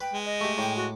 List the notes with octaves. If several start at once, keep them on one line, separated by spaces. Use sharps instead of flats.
B4 G5
G#3
D#5
A3 G4
A2 G5 D6
F#4